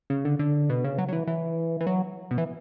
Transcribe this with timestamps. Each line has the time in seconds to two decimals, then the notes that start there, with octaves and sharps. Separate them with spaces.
0.10 C#3
0.25 D3
0.39 D3
0.70 B2
0.84 C#3
0.98 F#3
1.08 F#3
1.13 E3
1.27 E3
1.81 E3
1.87 F#3
2.31 B2
2.38 E3